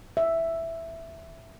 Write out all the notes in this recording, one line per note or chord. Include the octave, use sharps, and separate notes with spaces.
E5